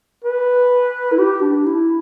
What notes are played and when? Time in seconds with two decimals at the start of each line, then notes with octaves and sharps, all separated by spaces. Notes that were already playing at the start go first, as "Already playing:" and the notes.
0.24 B4
1.12 E4
1.19 G4
1.42 D4
1.66 E4